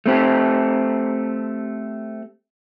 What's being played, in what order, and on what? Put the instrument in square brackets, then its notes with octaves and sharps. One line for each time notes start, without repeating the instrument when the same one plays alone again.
[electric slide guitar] A3 C4 G4